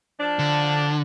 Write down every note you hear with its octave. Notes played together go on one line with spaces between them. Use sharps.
F3 D4
D3